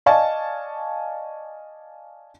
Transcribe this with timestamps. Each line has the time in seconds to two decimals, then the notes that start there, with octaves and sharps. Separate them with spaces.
0.06 D5 D#5 F5 G#5 A5 C#6